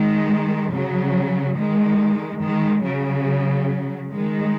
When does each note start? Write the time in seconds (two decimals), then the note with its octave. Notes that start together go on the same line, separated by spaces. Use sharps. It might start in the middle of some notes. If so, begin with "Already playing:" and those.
Already playing: D#3 G#3
0.74 C#3 F#3
1.57 D#3 G#3
2.42 D#3 G#3
2.84 C#3 F#3
4.11 D#3 G#3